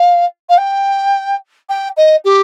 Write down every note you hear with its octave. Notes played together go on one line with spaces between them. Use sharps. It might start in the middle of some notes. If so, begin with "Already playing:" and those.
Already playing: F5
F5
G5
G5
D#5
G4